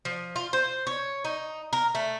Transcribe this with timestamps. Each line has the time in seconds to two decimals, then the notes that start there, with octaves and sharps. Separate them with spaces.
0.05 F3
0.36 F4
0.53 C5
0.87 C#5
1.25 D#4
1.73 A#4
1.95 A3